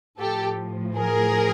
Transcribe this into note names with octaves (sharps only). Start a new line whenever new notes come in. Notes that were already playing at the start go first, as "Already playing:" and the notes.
A2 F3 G4 A4
G#4 A#4